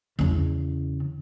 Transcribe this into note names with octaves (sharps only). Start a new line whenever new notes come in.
E2 C#3